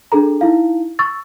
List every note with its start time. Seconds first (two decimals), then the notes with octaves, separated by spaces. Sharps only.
0.12 D4 G#4 A4 A#5
0.41 D#4 E4 F5
0.99 C#6 E6 A6